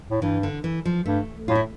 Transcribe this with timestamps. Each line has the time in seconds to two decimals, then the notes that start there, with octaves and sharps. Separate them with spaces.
0.11 A2
0.22 G2 E3
0.43 D3
0.64 E3
0.85 F3
1.06 G2 A3
1.48 A2 F4
1.55 E4